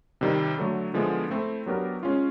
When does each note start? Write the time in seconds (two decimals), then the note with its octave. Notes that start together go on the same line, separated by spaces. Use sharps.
0.21 C3 D#3 G3
0.58 D3 F#3 A3
0.94 D3 F3 G#3 B3 E4
1.30 A3 C4 E4
1.66 F#3 B3 D4 G4 A#4
2.03 G#3 C#4 F4